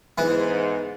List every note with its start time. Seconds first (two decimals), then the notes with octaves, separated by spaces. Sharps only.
0.18 G#2 E3 B3